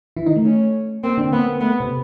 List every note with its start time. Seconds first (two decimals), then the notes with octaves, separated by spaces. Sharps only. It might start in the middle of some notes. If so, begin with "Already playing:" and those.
0.17 E3 E4
0.26 D#3 D#4
0.36 A3
0.45 C#4
1.03 A#3 C4
1.18 D3 D4
1.32 A#3 B3
1.47 A#3
1.61 A3 B3
1.80 C3 C4